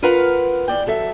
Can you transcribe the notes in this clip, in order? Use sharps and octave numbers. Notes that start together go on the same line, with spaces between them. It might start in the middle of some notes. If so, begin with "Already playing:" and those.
F4 A#4 B4 F5 F#5 A#5
E2 D5 G5
F#3 A4 E5